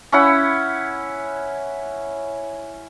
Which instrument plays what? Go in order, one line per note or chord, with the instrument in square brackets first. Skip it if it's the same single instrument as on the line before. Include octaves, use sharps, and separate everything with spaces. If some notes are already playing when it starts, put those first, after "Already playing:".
[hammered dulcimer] C#4 E4 F#5 B5